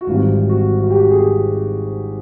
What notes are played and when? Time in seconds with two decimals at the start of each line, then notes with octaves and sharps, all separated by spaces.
0.01 F#4
0.07 G#1 G#2 E3 G3 C4 F4
0.49 F#4
0.80 F#4
0.91 G4
1.11 G#4